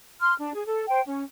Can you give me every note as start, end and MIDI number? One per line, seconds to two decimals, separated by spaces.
0.20 0.33 84
0.20 0.33 89
0.38 0.53 62
0.54 0.63 68
0.65 0.83 69
0.88 1.00 72
0.88 1.00 79
1.04 1.23 61